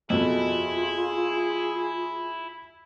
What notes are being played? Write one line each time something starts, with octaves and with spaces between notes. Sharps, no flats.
F2 B2 E4 F4 G#4